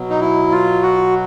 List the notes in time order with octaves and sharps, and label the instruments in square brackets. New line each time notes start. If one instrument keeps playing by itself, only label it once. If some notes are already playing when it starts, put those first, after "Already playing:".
Already playing: [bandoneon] B2 F#3
D#4
E4
F4
F#4